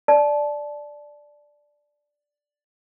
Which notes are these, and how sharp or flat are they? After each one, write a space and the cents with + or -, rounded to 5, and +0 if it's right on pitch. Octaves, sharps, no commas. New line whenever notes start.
D5 +0 A5 -25